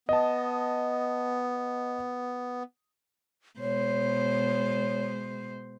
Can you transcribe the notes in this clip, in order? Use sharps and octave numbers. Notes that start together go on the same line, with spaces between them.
B3 D#5 A5
B2 G#3 C5 C#5